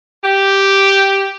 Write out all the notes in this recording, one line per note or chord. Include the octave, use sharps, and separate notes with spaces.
G4